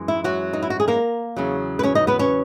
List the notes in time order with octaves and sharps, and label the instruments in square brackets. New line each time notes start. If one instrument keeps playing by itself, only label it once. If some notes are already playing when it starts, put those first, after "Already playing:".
Already playing: [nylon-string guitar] F#2 E3 G#3
E4
F#3 F#4
D#4
E4
F#4
G#4
A#3 A#4
E2 C#3 F#3
B4
C#4 C#5
D#4 D#5
B3 B4
C#4 C#5